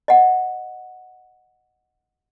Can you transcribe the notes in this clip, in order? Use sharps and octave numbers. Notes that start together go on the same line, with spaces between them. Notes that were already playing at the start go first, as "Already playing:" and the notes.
D#5 F#5